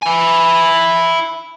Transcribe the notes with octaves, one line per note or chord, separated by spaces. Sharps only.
E4 G#5